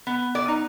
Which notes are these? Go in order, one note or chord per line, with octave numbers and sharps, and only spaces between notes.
B3
D5
D#4